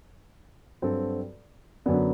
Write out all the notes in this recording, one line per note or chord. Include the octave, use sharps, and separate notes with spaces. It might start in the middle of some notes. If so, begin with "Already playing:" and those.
G2 F#3 C4 F#4 A4
F#2 D3 F#3 B3 D4